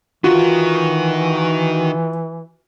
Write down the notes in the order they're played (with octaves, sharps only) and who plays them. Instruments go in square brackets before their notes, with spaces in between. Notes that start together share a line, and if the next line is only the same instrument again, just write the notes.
[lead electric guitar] D#3 A#4 [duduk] E3 [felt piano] F4 [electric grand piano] F#4